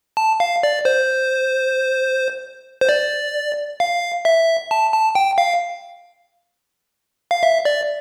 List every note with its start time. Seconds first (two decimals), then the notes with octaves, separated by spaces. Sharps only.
0.17 A5
0.40 F5
0.63 D5
0.85 C5
2.81 C5
2.89 D5
3.80 F5
4.25 E5
4.71 A5
4.93 A5
5.15 G5
5.38 F5
7.31 F5
7.43 E5
7.65 D5